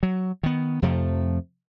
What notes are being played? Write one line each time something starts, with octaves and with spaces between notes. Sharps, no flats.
F#3
D#3 B3
F2 C3 F3 A3